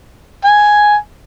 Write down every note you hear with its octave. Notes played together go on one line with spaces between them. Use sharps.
G#5